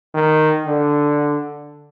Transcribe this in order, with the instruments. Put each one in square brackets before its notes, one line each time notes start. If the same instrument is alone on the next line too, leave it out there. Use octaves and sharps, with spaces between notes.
[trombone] D#3
D3